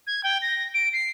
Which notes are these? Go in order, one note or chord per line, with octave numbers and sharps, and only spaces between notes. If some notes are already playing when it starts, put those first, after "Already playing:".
G#6
G5
A#6
D7
C7